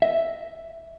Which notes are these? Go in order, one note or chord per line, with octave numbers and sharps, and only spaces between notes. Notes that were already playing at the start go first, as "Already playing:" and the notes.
D#5 E5